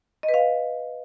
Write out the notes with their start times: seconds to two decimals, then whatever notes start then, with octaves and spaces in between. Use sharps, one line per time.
0.23 D#5
0.29 B4
0.34 F5